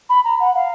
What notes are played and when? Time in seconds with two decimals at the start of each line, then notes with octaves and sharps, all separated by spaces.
0.09 B5
0.24 A#5
0.40 F#5
0.55 F5